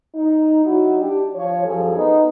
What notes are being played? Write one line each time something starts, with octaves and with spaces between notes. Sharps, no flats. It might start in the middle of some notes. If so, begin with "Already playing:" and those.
D#4
F#3 D#4 E4 F#4
D4 G4
F3 C#5
F#2 F3 G3 G#4 A4
B3 D#4